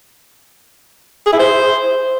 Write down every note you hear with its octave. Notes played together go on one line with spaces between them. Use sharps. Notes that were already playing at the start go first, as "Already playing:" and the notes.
G#4
E4
C5